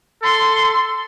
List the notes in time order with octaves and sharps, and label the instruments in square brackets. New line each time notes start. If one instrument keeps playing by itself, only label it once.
[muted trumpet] A4 [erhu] C6